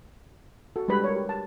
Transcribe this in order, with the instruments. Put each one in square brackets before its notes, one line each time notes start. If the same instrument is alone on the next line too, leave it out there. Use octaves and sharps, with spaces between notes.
[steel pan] F#4 A4
G3 G#3 D4 B4 B5
A#4 C#5
G4
A5